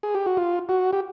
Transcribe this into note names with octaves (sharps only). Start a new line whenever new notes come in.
G#4
G4
F#4
F4
F#4
G4